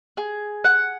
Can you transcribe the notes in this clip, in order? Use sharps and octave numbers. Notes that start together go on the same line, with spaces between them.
G#4
F#5